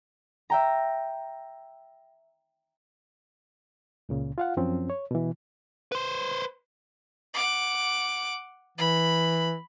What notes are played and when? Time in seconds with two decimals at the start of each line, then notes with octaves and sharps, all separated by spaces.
0.50 E5 G5 A#5
4.09 C#2 A#2 C#3
4.38 F4 F5 F#5
4.57 F#2 F3 C4 C#4
4.90 C#5
5.11 B2 E3
5.92 B4 C5
7.34 F#5 D6
8.78 E3 B5